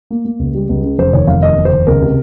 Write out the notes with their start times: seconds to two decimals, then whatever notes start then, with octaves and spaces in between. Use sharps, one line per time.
0.11 A#3
0.25 A#3
0.39 C#2
0.54 G3
0.69 C#2
0.84 C#3
0.99 F1 C5
1.13 D#2 C#5
1.27 F1 F5
1.42 D#2 D#5
1.57 F1
1.65 C5
1.72 D#2
1.87 C#2 A#4
2.01 C3